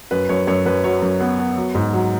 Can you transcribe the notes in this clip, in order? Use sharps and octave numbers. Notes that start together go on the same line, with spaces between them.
F#2 B4
F#2 C#5
F#2 C#5
F#2 B4
F#3 C#5
F#2
B3
B3
F#3
G#2
F#3